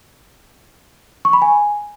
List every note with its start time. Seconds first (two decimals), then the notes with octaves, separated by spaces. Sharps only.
1.25 C#6
1.33 B5
1.42 G#5